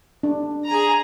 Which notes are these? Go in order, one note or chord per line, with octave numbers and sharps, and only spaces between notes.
D4
G#4 A#5